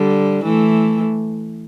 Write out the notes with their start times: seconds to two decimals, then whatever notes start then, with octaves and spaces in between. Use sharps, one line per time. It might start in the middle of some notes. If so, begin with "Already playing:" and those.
Already playing: D3 G3
0.44 E3 A3